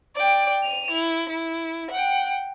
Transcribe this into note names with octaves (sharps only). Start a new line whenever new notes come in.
D5 G5
D#7 F7
E4
E4
F#5 G5